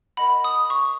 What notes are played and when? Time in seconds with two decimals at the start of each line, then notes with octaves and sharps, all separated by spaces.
0.17 A#4 D#5 F#5 B5
0.44 D#6
0.70 C#6